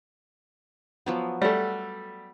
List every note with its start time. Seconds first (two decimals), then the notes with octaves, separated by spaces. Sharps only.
1.06 F3 F#3 B3
1.42 G3 A3 A4 F#5